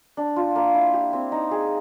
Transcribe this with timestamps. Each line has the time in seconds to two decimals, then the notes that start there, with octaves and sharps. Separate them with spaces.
0.17 D4
0.36 F4
0.56 A#3
0.75 E4
0.93 G4
1.13 C4
1.32 D#4
1.51 G#4